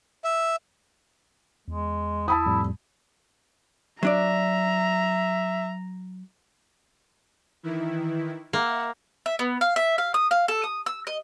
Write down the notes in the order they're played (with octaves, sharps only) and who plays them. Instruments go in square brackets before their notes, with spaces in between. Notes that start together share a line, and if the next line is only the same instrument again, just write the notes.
[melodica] E5
[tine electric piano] E2 [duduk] G#3
[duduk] E4 [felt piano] A5 B5 D#6
[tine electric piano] F2 A2 G3
[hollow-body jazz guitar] F#3 D4 D5 [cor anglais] E5 [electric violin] A#5
[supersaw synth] D#3 E3 E4
[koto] A#3 [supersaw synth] E5 F#5
[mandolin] E5
B3
F5
E5
F5
D#6
F5
A4
D#6
E6
D#5